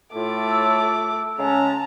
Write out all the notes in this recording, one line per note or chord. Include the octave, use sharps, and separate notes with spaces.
A2 A3 F4 D6
E6
C#3 G#3 C#4 A5 A#5